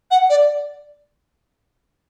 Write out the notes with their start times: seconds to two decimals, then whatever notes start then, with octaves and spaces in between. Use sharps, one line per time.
0.11 F#5
0.29 D5